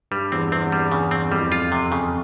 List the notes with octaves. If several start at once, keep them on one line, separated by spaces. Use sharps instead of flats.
G2 G3
E2 C4
E2 C4
G3
C#3
C4
F2 G3
F4
C3
C#3